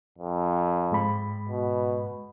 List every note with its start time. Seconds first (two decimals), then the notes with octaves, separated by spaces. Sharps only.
0.18 F2
0.91 G#2 G#3 B5
1.49 B2